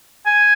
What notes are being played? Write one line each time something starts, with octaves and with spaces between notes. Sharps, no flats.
G#5